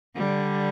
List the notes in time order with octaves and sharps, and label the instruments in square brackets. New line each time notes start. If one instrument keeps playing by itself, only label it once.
[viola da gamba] D3 G3